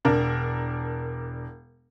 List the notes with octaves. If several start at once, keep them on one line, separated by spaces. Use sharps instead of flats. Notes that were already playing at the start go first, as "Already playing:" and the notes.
E1 D4 A#4